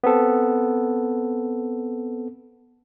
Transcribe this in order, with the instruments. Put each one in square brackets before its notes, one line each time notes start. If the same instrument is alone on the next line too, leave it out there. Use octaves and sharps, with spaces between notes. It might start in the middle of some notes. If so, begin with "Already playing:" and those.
[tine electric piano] B3 C4 A4